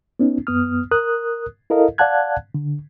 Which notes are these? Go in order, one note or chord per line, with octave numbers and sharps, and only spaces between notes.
B3 C#4 D#4
F#2 B3 D#6 F6
A#4 D#6 F#6
E4 A4 A#4 D#5 F5
D5 F5 F#5 A5 F#6 G#6
D3